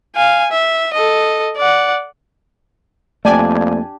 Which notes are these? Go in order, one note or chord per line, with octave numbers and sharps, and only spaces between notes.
F5 G#5
E5
A4 D#5
D5 F#5
F2 A3 A#3 D4 G4 D5 G#5